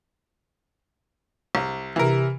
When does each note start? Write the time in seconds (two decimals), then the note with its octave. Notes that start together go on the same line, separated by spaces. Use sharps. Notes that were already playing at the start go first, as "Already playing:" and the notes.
1.55 C2
1.96 C3 E3 A#4